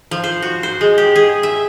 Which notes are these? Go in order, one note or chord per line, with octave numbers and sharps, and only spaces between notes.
F3
C5
F#4
C5
G#3
G4
G#4
E5